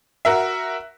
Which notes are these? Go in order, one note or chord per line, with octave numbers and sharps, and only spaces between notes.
F#4 A#4 E5